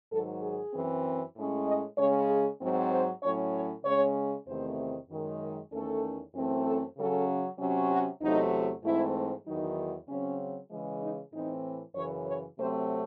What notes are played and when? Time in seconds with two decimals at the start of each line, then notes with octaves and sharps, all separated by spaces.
0.12 G#2 D#3 F#3 A4
0.42 G#4
0.73 F#2 E3 C4
1.35 A2 G#3 C#4
1.67 D#5
1.98 C#3 G#3 C#4 C#5
2.29 G#4
2.61 G#2 F#3 C4
2.92 C5
3.23 A2 F#3 C#4 C#5
3.54 C#5
3.85 C#3 G#3 C#4 C#5
4.47 E2 C3 D#3 A3 C4 C5
5.09 F#2 D#3 G#3
5.72 E2 D#3 A3 C#4 A4
6.35 F#2 E3 A3 C4
6.65 A4
6.97 C#3 F#3 C#4 A4
7.59 C3 F#3 C#4
7.90 F#4
8.22 E2 C3 F#3 A3 D#4
8.84 G#2 E3 A3 C4 E4
9.47 E2 D#3 F#3 D#4
10.08 C#3 F#3 C4 C#4
10.71 C#3 E3 G#3
11.02 D#4
11.33 A2 E3 C4 D#4
11.95 F#2 C#3 E3 C#5
12.28 C#5
12.58 C3 F#3 A3 C4 C5